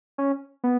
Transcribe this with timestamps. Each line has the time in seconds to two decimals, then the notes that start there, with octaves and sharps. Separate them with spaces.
0.18 C#4
0.64 B3